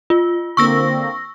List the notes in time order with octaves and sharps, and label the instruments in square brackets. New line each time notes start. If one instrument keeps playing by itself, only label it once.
[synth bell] F4
[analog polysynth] D3 A#3 C4 [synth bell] C#6 E6 A#6